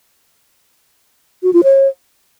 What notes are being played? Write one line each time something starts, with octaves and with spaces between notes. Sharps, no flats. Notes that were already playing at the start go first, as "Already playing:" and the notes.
F#4
F4
C#5